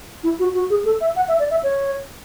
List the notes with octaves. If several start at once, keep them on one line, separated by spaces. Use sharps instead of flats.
E4
F#4
F#4
G#4
A4
E5
F#5
E5
D5
E5
C#5